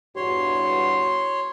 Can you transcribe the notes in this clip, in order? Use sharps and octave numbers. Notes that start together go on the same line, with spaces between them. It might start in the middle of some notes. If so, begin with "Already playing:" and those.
E2 G2 F#4 C#5 C6